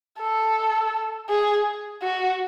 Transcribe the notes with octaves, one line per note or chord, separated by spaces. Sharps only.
A4
G#4
F#4